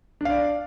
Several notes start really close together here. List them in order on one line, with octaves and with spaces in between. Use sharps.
D4 F5 D5